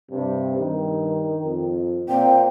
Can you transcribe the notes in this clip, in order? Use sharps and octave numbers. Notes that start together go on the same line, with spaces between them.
G2 C3
G2 D#3
F2
A#2 C4 G5